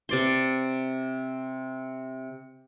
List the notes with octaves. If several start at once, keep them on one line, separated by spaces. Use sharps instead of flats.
C3 D5 C6